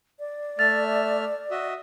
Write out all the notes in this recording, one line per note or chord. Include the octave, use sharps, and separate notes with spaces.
D5
A3 E5 F6 A6
F#4 D#5 E5